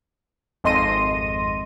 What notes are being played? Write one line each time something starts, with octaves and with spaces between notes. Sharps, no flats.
G#1 F2 D#5 C6 A#6 D#7